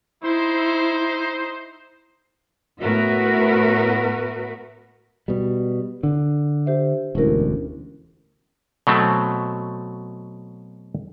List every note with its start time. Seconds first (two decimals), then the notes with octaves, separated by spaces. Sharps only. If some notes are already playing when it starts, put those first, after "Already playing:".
0.24 D#4 E4 C5
2.82 A2 B3 F#4 A#4 B4 E5
5.28 B2 G3
6.03 D3
6.66 G4 C5 E5
7.15 E1 D2 C#4 E4 A#4
8.87 B2 F#3 A3 C4